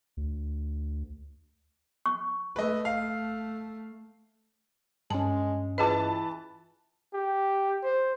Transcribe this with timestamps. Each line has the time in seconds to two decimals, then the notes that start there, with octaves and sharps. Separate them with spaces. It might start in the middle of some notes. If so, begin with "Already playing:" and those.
0.17 D2
2.06 C#6
2.56 A3 B4 D#5
2.85 F5
5.11 G2 G#3 C#4 A5
5.78 E3 F4 G#4 B4 D#5 A5
7.14 G4
7.84 C5